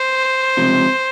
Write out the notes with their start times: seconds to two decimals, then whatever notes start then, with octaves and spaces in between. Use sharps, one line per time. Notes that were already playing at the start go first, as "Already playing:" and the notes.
Already playing: C5
0.57 C#2 C3 F3